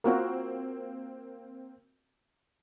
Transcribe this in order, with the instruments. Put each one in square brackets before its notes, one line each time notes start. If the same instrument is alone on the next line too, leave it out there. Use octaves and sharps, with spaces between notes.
[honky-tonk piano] A#3 C4 [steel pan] F4 F#4 A#4